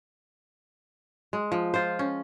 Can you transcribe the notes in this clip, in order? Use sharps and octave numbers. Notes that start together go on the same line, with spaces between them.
G#3
F3
F4 C5
C#4